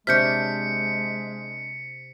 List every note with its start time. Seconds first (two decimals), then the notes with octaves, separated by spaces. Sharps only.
0.07 C3 G#3 D4 C#5 F6 G6 B6 C#7